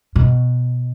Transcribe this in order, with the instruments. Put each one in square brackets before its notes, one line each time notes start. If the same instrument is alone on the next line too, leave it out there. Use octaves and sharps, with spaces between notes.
[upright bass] B2